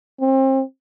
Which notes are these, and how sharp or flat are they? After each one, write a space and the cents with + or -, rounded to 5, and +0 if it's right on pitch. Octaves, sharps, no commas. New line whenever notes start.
C4 +35